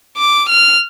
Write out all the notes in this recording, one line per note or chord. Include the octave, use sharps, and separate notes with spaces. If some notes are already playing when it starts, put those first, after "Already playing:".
D6
F6